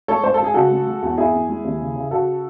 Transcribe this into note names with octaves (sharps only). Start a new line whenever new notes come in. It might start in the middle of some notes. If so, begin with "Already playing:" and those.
G#3 A4 C#5
G#3 C5
A4
G#3 G#4
C#3 F#4 A4
G#3
G#3
E2
E2 E4 G#4
E2
G#3
D#2
C#3
C#3
C#3 F#4 A4